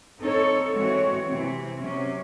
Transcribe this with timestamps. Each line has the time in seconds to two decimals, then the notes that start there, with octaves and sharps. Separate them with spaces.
0.20 C4 D#4 A4 C#5
0.74 E3 G#3 C4 F#4 C#5
1.28 C3 E3 C4
1.81 C3 F#3 C#4